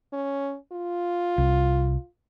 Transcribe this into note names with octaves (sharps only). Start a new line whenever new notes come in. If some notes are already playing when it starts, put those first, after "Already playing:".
C#4
F4
C2